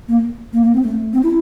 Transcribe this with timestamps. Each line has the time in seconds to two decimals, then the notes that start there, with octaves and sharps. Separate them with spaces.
0.08 A#3
0.53 A#3
0.63 A#3
0.73 C4
0.83 A3
1.13 C4
1.23 E4